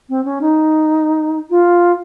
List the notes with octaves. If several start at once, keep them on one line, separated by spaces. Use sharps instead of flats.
C4
C#4
D#4
F4